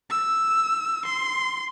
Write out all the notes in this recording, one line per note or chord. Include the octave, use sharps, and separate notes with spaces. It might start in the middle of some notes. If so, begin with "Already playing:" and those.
E6
C6